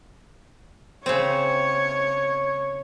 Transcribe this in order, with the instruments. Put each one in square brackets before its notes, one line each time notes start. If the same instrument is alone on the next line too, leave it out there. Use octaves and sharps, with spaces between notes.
[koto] C#3 C4 [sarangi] C#5